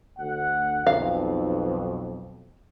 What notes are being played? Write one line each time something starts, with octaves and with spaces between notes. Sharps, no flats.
D2 F#5
B1 F2 F5